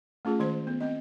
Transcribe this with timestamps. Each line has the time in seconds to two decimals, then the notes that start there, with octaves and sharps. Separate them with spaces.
0.25 A3 C#4 F4 G#4
0.40 D#3 G#3 C5 C6
0.67 B3
0.80 C4 D#5